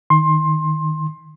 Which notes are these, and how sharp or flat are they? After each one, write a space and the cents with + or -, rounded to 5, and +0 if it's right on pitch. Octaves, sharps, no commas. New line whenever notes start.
D#3 +0 C6 +20